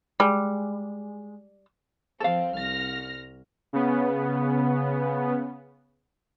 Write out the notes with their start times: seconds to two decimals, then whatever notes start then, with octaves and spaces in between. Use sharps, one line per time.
0.20 G3 G#3
2.20 F3 C4 A4 F5
2.56 C2 F6 A#6
3.73 C#3 B3